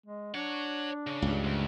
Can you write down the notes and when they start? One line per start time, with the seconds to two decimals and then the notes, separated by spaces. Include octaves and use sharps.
0.06 G#3
0.34 D4 C#5 F#5
1.07 C#3
1.22 C#2 G2
1.44 D2